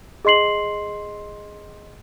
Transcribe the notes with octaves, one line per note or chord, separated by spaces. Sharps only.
G#4 D#5 C6 C7 F#7